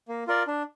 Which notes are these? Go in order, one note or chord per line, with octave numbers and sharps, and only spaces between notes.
A#3
F4 A#4 D5
D4